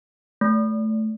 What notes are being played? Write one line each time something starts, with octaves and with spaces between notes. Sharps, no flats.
A3